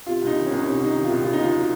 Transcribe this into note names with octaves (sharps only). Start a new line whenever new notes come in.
C3 F4
C2 D#4
D#3
C2 C#4
D#4
C3 C#4
C2 D#4
D#3
F4
C2
C#3 F4
D#4
D#2 F4
F#3